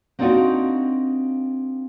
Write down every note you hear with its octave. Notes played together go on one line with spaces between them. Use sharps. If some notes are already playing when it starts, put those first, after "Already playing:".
A#3 C4 D4 D#4 F4 F#4